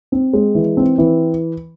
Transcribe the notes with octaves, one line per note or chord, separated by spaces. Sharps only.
C4
G#3
E3
C4
E3